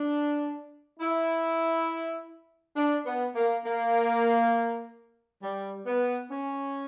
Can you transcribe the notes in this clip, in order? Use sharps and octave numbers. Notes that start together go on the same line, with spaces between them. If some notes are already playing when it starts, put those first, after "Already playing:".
Already playing: D4
E4
D4
B3
A#3
A#3
G3
B3
C#4